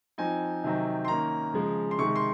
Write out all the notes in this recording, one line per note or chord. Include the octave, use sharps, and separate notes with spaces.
F3 C4 D#4 G#5
C3 D#3 F#3 C4 D#4
C6
D#3 A#3 C#4 A#5
C#3 F3 G#3
C6
C3 D#3 G#3 C#6
C6